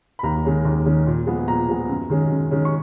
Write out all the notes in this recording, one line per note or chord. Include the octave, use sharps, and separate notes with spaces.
B5
D#2 A#5
D#3 G#3 C#4
D#2
D#3 G#3 C#4
A#2
F3 G#3 B3
A#2 A#5
F3 G#3 B3
F#2
D#3 G#3 C#4
F#2
D#3 G#3 C#4
C#6